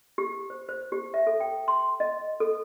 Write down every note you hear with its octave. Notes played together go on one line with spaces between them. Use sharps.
G4
C5
C5
G4
E5
A4
G5
C6
D#5
A4